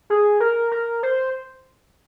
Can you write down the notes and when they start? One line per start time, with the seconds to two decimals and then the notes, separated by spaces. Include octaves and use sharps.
0.10 G#4
0.40 A#4
0.72 A#4
1.03 C5